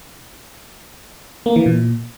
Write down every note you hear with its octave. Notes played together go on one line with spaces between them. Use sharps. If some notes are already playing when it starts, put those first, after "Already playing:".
A#3
E3
A#2